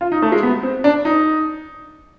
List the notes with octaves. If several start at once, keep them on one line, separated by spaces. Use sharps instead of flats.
F4
D#4
A3
G#3
B3
C4
D4
D#4